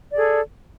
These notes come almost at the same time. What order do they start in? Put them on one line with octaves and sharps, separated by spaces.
D5 G#4 A4